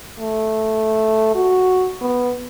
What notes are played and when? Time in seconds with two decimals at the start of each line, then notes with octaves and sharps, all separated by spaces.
0.19 A3
1.35 F#4
2.01 B3